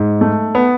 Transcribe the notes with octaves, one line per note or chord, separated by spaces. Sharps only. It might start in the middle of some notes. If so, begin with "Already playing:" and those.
Already playing: G#2
A3
B3